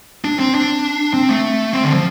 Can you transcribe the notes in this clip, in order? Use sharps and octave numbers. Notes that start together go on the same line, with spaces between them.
D4
C4
D4
C4
A3
C4
D3
F3